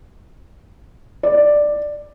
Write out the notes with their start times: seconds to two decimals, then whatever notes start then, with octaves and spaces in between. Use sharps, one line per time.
1.23 D5